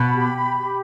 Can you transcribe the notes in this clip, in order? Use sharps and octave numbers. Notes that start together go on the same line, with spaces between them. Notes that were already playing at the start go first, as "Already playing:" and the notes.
Already playing: B2 B5
G4
G4